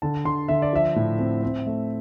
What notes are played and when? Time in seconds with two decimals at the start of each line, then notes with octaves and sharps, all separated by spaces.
0.02 D3 A5
0.25 D3 C6
0.48 D3 E5
0.62 D5
0.73 F3 E5
0.96 A2
1.19 C4
1.43 C4
1.67 A3